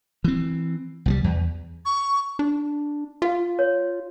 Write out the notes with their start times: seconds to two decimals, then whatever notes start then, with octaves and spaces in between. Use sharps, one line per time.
0.24 E3 C4
1.06 C2 F#3 G3
1.24 E2
1.85 C#6
2.39 D4
3.22 F4 F5
3.59 C#5